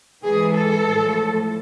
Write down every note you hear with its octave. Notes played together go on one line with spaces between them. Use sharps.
G#2 E3 G#4
A4
A2 F3